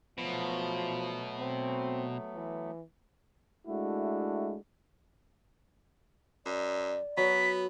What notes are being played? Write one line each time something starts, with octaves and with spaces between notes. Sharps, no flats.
B2 F3 F#3 A3 B3
C4
E3
G#3 A3 D4 E4 F#4
F#2 D5
F#3 B3 B6